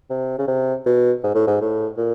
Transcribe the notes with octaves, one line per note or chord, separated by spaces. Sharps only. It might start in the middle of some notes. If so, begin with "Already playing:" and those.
C3
C#3
C3
B2
G#2
A2
G#2
A2
A#2